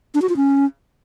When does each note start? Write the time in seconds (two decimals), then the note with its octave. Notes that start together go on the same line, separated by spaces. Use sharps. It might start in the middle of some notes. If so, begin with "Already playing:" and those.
0.15 D4
0.22 F#4
0.29 F4
0.36 C#4